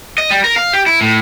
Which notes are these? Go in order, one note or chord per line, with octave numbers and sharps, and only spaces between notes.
D#5
G3
A#4
F5
G4
E4
A2